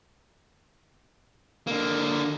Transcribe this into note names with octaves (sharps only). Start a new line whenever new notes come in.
D3 A#3